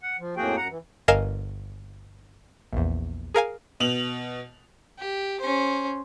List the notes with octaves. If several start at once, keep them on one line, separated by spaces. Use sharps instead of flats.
F#5
F3
F2 A2 A#3 F#4 G#4 G5
F#2 F#5 A#5
E3
G1 A#4 D#5 F5 G#5 E7
A#1 E2
G#4 A#4 F5 G#5
B2 F7 F#7
G4
C#4 C5